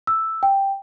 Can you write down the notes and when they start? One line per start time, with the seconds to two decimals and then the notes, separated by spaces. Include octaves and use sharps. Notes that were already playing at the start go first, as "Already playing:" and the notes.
0.07 E6
0.43 G5